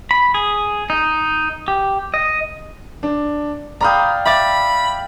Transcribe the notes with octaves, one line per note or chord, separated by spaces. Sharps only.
B5
G#4
D#4
G4
D#5
D4
D5 F5 G5 A#5 B5 D#6
E5 B5 D6 A6